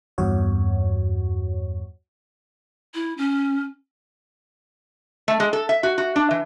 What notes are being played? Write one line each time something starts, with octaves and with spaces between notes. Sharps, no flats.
E2 G2 F#4 C#5
E4
C#4
A3
G#3
A4
E5
F#4
F#4
D4
E3